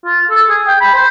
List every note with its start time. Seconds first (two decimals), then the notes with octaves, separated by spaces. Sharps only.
0.05 F4
0.30 A4
0.49 G#4
0.67 G5
0.81 B5
0.94 C5